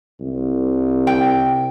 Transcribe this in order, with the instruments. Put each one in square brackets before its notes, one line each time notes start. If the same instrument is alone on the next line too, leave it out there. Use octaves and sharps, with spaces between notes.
[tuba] C2
[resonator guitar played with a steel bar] G5